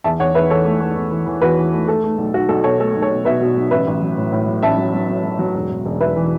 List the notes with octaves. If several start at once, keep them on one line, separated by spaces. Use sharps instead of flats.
E2 E5 A5
E2 C#5 F#5
E2 B4 E5
E3 A4 C#5
A3
A3
E2
E3
E3
E2 F#4 B4
E3
A3
A3 A4
A3
B1
B1 F#4
B1 A4
B2 A4 C#5
A3 A4
B1
A4 C#5
B2
B2 B4 E5
B2
B1
A1 B4 E5
A1
F#3
A2
A2
F#3
A1 E5 A5
F#3
F#3
F#3
F#3
F#3
E1
E1
E1
E1 B4 E5
E3